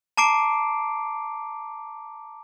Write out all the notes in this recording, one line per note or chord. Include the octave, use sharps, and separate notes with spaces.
A5 A#5 D6 C7 D7